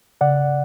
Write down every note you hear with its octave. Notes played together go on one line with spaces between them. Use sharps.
C#3 D5 F#5